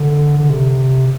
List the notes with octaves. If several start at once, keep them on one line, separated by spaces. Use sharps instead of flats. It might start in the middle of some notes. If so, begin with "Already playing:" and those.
Already playing: D3
D3
C3